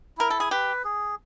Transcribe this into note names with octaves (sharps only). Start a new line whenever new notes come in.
E4 A#4
A4
G#4
G4 B4
G#4